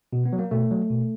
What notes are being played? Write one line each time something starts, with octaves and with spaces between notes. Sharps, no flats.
B2
B3
F#3
A#3
B2 A3
F#3
B2